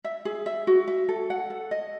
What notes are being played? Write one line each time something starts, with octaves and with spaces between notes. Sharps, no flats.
E5
G#4
E5
F#4
E5
A4
F#5
A4
D#5